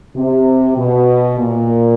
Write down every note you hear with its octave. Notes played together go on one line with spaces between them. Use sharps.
C3
B2
A#2